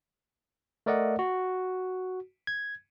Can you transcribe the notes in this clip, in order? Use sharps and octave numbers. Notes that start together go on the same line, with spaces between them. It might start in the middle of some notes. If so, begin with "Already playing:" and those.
A3 A#4 D5 D#5 F#5
F#4
G#6